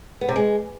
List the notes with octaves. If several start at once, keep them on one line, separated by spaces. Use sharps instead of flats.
B3
C3
G#3